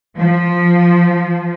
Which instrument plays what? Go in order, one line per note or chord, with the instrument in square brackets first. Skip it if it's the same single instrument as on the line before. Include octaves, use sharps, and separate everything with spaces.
[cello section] F3